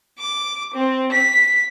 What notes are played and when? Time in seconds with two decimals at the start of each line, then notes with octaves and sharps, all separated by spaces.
0.19 D6
0.74 C4
1.12 B6